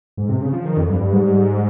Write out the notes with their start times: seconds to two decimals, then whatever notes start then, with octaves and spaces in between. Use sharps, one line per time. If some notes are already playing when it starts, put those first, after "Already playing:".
0.17 G#2
0.29 C3
0.41 C#3
0.53 F3
0.65 D#3
0.77 F2
0.90 G2
1.01 G2
1.13 G#2 G3